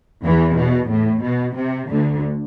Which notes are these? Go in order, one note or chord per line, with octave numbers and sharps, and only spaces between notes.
E2 E3
B2
A2
B2
C3
D2 D3